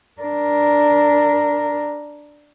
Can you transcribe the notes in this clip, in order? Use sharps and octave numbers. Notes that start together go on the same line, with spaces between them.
D4 A#4